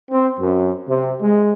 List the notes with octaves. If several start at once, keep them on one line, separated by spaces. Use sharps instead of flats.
C4
F#2
C3
G#3